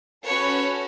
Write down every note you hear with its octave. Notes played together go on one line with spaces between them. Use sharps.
C#4 F#4 A4 B4 C#5